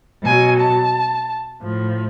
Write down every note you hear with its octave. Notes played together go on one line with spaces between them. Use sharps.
B2 F#3 G#5
A5
A2 F3